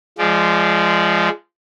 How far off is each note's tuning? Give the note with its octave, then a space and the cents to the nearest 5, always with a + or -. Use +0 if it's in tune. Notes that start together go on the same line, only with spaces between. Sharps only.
F3 -20 G#3 +0 D5 +0